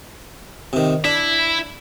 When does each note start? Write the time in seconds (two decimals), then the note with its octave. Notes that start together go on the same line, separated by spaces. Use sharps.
0.73 C3 D#3
1.05 D4 E4 E5